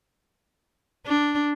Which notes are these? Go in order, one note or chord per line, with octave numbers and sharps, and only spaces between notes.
D4